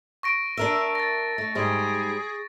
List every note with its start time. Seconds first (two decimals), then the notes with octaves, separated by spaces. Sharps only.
0.23 C#6 A#6 D7
0.57 D4 A#4 E5
0.95 A6 A#6
1.38 A3
1.55 G#2 G3 G#4